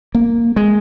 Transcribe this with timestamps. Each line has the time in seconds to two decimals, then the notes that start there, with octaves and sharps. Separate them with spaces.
0.15 A#3
0.56 G#3